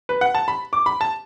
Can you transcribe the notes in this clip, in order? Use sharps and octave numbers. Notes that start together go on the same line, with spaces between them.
B4
F#5
A5
B5
D6
B5
A5